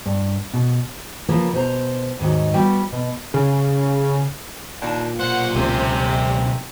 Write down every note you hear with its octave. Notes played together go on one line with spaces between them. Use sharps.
G2
B2
C#3 F3 A#3 A#4 B4
B2 C5 A#5
D#2 G#2 D#3 F#3
G3 B3 F#4 G5
B2
C#3
D#2 A#2 D4
B1 C5 F#5
C#2 C3 C4